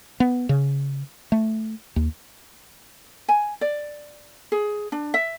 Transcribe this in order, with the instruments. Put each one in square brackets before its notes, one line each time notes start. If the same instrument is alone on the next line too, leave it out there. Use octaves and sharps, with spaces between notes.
[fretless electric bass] B3
C#3
A3
D#2
[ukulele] G#5
D5
G#4
D4
E5